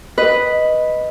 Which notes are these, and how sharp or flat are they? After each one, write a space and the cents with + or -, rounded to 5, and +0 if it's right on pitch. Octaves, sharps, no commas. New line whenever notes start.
B4 +0 D#5 +0